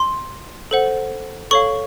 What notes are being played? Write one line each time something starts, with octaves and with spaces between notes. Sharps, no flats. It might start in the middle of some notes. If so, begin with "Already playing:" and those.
Already playing: C6
A4 C5 F#5
A4 C#5 F5 C#6